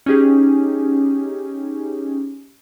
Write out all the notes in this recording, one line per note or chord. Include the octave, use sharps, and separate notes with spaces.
C#4 D#4 G4 G#4